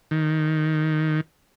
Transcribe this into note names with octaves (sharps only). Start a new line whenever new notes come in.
D#3